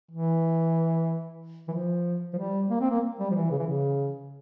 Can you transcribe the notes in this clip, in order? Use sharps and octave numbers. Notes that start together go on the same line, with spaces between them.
E3
E3
F3
F3
G3
A#3
C4
A#3
G3
F3
E3
C#3
E3
C#3